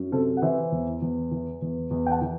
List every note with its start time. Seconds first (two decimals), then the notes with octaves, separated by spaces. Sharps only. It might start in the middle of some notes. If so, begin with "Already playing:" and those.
Already playing: F#2
0.12 C3 A4 C5
0.37 F#5
0.42 E3 C5 E5
0.72 E2
1.02 E2
1.31 E3
1.61 E2
1.91 E2
2.06 G5
2.11 F#5 A5
2.21 E3